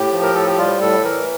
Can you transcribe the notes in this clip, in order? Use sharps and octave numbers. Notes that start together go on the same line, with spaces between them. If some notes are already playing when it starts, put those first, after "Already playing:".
Already playing: A2 G4
F3
A#4
A2 A4
G4
G3 F4
A2 A4
E3 A#4